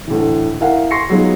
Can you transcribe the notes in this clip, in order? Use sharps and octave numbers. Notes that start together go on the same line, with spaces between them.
D2 A2 D3 E3
E4 A#4 F5 F#5
C6 C#6 A#6 C7 C#7
F#3 G#3 B3 D#4 F4